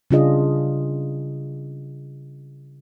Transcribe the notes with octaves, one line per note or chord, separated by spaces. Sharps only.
C#3 G3 D4 F4 G#4 D#5